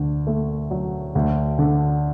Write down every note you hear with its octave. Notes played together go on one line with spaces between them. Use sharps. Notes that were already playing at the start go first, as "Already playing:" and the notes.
Already playing: D2 D3
A3
F#3
D2
D3